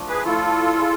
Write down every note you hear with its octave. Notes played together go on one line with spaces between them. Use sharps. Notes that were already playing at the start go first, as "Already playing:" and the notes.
Already playing: F3 A3 D4
G#4 B4
F3 A3 E4 F4 A4
E4 G#4 C5